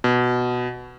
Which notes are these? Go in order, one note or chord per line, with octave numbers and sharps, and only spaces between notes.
B2